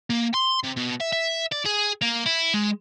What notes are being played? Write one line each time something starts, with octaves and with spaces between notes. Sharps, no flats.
A#3
C6
C3
B2
E5
E5
D5
G#4
A#3
E4
G#3